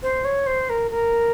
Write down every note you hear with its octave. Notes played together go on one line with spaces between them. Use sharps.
C5
C#5
C5
A#4
A#4